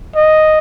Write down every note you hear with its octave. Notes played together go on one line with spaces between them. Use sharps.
D#5